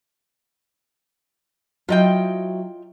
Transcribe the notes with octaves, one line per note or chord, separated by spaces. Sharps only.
F#3 E4 F4 D#5 G5